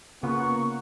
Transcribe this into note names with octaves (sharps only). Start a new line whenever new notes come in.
C#3 A#3 B3 F4 F#5 A#5 C#6